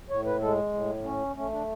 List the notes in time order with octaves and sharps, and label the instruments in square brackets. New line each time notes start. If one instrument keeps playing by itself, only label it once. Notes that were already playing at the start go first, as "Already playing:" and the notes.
[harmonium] A2 C#5
B4
G#3 A4
A2
C#4
A3 C#4
D4